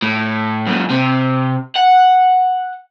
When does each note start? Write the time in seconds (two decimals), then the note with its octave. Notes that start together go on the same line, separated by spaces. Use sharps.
0.02 A2
0.67 F#2 A#2
0.90 C3
1.76 F#5